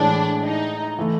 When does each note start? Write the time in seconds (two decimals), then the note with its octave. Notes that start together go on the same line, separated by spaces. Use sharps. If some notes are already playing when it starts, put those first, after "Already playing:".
Already playing: A2 E3 G#3 D4
0.43 D#4
0.99 E3 A3